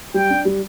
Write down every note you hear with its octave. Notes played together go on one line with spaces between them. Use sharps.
G3 G5
D4
G3